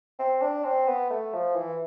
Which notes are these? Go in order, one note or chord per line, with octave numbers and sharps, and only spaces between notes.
C4
D4
C4
B3
A3
F3
E3